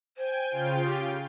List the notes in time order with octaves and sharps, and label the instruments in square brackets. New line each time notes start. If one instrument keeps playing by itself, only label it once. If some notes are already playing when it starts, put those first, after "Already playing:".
[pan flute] C5 [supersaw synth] G5 G#5
[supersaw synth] C#3 F4 G5
[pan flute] G4